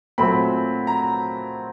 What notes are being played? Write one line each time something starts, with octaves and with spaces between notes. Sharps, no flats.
A#2 F#3 A3 C4 B5
A#5